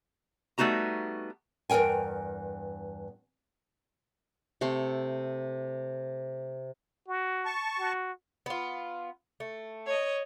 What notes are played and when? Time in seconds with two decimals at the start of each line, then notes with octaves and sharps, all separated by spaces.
0.58 G3 A3 B3 D#4 F#4 A#5
1.70 E2 G2 A#4 G5 G#5
4.61 C3 A3 A4 C6
7.08 F#4
7.45 A5 C#6
7.79 F#4
8.46 B3 F4
9.40 A3
9.85 C#5 D#5